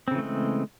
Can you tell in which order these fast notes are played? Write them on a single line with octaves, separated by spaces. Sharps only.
C4 C#3 E3 A3 G#3